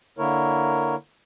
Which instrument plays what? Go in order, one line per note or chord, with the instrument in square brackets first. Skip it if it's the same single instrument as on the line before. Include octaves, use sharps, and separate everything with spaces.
[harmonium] D3 A#3 E4 A#4 C#5